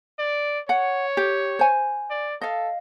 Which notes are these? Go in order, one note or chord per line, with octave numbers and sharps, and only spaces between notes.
D5
C#5 F#5
G4
C5 G#5
D5
A4 D#5 F5